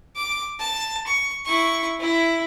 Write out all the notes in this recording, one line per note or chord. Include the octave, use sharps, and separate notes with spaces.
D6
A5
C#6
E4 C#6
E4